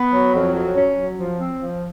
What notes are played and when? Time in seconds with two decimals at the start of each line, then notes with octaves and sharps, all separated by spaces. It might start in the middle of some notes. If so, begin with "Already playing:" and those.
Already playing: B3
0.13 F#3
0.33 F2
0.54 F#3
0.75 C#4
0.97 F#3
1.17 F3
1.38 C4
1.59 F3